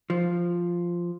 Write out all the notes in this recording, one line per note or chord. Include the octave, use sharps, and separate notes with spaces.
F3